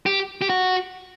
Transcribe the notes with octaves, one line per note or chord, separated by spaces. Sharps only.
G4
G4
F#4